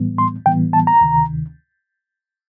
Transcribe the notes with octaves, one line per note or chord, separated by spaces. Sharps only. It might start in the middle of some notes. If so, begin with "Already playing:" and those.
Already playing: A2 E3 G3 B3
C6
A2 E3 G3 B3 G5
A5
A#5
D2 C3 D#3